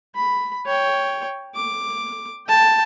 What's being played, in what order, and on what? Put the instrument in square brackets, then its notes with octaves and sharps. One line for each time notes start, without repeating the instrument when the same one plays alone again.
[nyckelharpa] B5
C#5 G5
D6
G5 A5